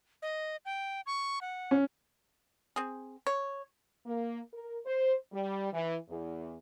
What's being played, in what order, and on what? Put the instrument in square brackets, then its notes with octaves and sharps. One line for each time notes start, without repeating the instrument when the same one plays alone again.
[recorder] D#5
G5
C#6
F#5
[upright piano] C#4
[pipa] C4 G#4
C#5
[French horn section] A#3
A#4
C5
G3
E3
E2